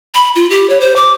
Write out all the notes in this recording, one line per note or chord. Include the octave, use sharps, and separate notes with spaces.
B5
F4
G4
C#5
C5
D6